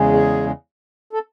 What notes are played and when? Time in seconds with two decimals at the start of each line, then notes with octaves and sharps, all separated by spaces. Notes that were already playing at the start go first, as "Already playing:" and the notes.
Already playing: E2 C#3 G#3
0.13 G#4
1.13 A4